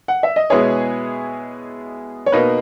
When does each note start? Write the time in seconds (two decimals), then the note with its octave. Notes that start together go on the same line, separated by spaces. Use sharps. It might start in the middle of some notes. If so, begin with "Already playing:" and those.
0.08 F#5
0.23 E5
0.36 D#5
0.50 B2 G#3 B3 E4 G#4 C#5
2.26 C#5
2.32 B2 A#3 D#4 B4